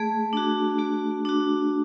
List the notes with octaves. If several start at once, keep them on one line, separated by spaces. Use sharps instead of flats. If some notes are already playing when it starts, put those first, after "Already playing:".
Already playing: A3 G#4
D4 F#4
A3 F#4
D4 F#4